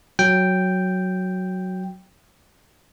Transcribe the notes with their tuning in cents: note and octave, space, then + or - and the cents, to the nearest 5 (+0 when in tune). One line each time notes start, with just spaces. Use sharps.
F#3 +0 G5 +0